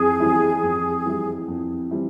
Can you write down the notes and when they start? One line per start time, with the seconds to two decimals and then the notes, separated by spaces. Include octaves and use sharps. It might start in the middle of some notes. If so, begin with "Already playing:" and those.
Already playing: F2 E3 E4 G#4
0.20 E3 G3 C4 E4
0.63 F2
1.05 E3 G3 C4 E4
1.48 F2
1.91 E3 G3 C4 E4